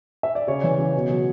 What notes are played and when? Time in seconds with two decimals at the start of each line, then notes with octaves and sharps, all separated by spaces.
0.23 E5
0.35 D5
0.47 C#3 C#5
0.63 E3
0.78 C#3
0.95 B2
1.10 F#3